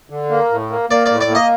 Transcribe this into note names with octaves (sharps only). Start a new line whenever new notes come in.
D3
A#3
A2
A#3
A#3 D5
A2 D5
D5
A#3
D#5